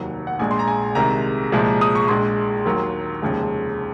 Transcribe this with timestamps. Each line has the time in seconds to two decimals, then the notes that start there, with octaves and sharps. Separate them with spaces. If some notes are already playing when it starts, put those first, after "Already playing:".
Already playing: F1 D#2 D#3 F#3 F#5
0.27 F#5
0.39 A#1 A#2 G#3 G#5
0.51 C6
0.59 A#5
0.68 G#5
0.95 C2 C3 D#3 G#3 A#5
1.52 C2 A#2 F3 G#3
1.81 D#6
1.95 C#6
2.08 A#1 A#2 G#3 C6
2.65 D#2 D#3 F#3
3.22 F1 D#2 C#3 F3 G#3